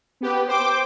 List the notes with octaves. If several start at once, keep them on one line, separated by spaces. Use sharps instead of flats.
B3 G4 B4
C5 G5 D6 G6